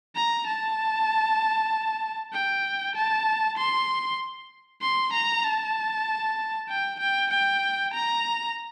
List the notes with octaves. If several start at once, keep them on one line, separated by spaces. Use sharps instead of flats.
A#5
A5
G5
A5
C6
C6
A#5
A5
G5
G5
G5
A#5